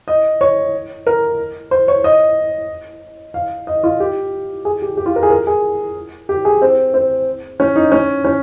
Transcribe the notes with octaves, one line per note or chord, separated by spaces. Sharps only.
D#5
C#5
A#4
C5
C#5
D#5
F5
D#5
F4
G4
G#4
G4
G4
F4
A#4
G#4
A#4
G#4
G4
G#4
C4
C4
C#4
D#4
C#4
C#4